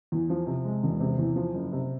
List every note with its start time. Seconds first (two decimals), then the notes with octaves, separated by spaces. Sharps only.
0.12 E2
0.30 F3
0.47 C3
0.65 G#3
0.83 E1
1.00 C3
1.18 E2
1.36 F3
1.54 F#1
1.72 C3